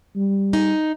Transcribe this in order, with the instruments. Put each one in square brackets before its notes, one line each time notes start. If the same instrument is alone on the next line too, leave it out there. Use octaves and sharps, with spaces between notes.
[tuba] G3
[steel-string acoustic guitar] D#4